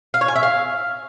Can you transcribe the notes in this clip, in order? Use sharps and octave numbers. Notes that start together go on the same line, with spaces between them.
F5
C#5
G#5
E5
F5